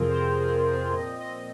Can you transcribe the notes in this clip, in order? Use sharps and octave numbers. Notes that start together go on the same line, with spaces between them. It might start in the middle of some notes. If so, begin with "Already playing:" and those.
Already playing: F2 C3 F3 C4 F4 G#4 A#4
C5
A#4
G#4
G#4
A#2 F3 C4 D#5
D#5